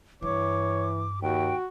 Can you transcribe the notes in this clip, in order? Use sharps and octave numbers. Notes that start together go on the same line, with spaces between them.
G2 E3 C#5 D6
D#2 F#4 G5